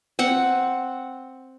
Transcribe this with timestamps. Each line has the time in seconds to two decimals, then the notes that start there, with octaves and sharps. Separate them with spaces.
0.19 C4 F#5